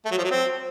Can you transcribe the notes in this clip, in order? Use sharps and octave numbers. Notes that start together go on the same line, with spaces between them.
A3
F#3
F3
F#3
C4